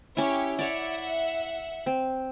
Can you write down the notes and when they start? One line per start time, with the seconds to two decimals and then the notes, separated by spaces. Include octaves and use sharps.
0.17 C#4 E4 G4 C#5
0.59 C#5 D5 E5 F#5
1.86 C4